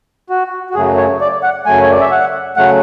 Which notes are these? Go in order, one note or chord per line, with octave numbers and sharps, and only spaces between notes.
F#4
F#4
F#2 C#3 F#3 A3 G#4
C#5
D5
F#5
F#2 C#3 F#3 A3 G#5
C#5
D5
E5
F#5
C#3 F#3 A3 F#5